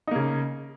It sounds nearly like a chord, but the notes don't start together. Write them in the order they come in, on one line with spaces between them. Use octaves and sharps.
D#4 A#3 C#3